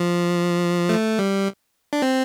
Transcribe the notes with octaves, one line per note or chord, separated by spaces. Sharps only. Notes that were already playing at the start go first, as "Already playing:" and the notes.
Already playing: F3
A3
G3
D4
C4